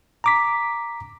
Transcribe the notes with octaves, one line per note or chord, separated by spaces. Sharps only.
A#5 D6 B6